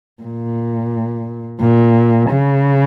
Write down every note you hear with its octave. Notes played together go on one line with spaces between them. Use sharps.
A#2
A#2
C#3